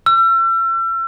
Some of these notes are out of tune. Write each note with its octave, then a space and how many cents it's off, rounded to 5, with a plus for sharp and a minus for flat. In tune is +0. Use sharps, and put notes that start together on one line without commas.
E6 +40